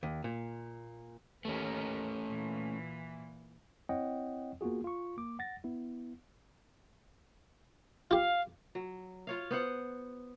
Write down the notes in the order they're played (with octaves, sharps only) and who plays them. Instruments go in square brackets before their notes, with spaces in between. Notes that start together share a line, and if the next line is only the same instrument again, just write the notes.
[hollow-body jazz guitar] D#2
A#2
[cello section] D#2 A#4 B4 [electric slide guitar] A3 C#4
[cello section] A#2 E3
[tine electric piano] C4 E4 C#5 D#5 F#5 G5
A#3 B3 F4 F#4 G#4
F4 C#6
A#3 D6
F#5 A6 A#6
B3 E4
[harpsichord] F4 G4 [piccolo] F5
[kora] F#3
F4 C#5 F5
B3 C5 F#5